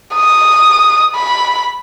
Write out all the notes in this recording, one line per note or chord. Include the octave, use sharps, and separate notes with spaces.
D#6
B5